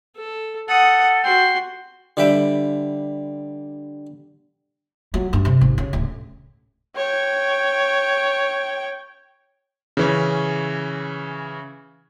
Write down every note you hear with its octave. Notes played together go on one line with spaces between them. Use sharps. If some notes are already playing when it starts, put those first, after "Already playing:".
A4
A4 F#5 D#6
F#4 G5 C6
D3 G3 B4 E5 G5
F#3
G2
C3
G#1
C#3
D1
C#5 G5
C#3 E3 C#4